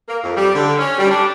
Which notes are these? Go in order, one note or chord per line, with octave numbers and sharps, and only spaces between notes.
A#3
F2
G3
D3
C#4
G3
D4